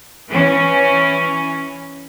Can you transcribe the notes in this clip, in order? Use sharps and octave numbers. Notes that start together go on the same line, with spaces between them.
E3 C#4